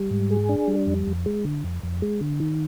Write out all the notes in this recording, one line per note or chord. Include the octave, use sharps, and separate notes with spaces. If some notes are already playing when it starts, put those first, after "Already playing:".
Already playing: G3
G#2
G#4
D4
G3
F2
F2
G#3
D3
F2
F2
G#3
D3
D#3